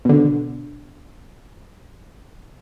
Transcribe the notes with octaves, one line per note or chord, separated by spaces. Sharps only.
B2 D3